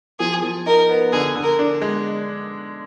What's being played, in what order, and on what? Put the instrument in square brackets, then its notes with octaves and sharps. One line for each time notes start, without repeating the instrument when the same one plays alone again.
[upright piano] F3 [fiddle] G#4
[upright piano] F3
[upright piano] D#4 [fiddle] A#4
[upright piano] B3
[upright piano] D3 [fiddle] G#4
[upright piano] D3
[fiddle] A#4
[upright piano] D4
G#3